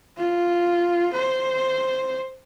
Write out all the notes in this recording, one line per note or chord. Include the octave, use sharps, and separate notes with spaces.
F4
C5